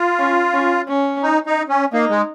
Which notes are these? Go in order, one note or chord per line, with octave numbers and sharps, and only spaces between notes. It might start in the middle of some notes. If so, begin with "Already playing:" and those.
Already playing: F4
C#4
C#4
C#4
D#4
D#4
C#4
A#3 D#4
G#3